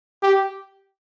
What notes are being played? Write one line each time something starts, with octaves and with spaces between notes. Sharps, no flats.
G4